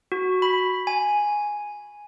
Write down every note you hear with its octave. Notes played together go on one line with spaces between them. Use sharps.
F#4
B5
G#5